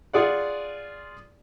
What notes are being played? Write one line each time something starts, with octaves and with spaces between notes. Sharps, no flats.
F4 G#4 D5 F#5